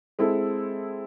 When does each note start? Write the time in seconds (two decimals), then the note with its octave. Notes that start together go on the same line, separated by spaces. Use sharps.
0.19 G#3 C4 E4 A4